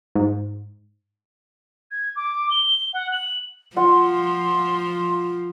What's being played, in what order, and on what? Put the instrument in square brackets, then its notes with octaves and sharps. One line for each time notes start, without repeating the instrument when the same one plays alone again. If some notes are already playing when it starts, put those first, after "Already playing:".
[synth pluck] G#2
[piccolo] G#6
D6
G7
F#5
F#7
[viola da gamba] F3 [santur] F4 F#5 [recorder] C6